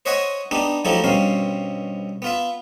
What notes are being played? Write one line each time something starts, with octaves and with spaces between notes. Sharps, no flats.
C5 C#5 D#5 E5 F#5 G#5
B3 D4 D#4 G4
F3 F#3 A3 D#4 E4 G4
G2 B2 C4 C#4 F5
B3 F4 E5